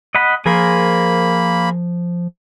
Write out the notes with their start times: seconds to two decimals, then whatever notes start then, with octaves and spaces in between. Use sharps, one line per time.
0.15 D#5 F#5 B5
0.46 F3 A#3 G#4 A#4 C5 B5